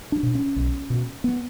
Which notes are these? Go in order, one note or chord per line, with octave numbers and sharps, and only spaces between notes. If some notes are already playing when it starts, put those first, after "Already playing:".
D4
B2
C#4
B1
B2
B3